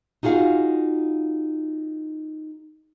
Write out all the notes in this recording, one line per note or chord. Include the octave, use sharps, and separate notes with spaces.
D#4 F4 F#4 G#4 F5